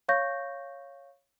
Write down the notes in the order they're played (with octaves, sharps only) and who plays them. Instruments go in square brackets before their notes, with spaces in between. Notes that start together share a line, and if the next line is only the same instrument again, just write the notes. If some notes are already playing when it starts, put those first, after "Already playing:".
[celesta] C#5 F5 C#6 G6 A#6